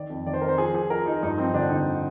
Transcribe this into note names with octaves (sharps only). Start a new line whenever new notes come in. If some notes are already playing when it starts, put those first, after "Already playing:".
Already playing: D#3 D5
F2
D#3 D5
C5
D#3 A#4
C5
F3 G#4
F3 G#4
F3 A#4
F3 D#4
G2 D#4
F3 C4
D3 D4
D3 D#4